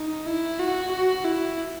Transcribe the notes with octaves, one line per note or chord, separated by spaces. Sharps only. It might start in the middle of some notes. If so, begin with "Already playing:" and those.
Already playing: D#4
E4
F#4
F#4
E4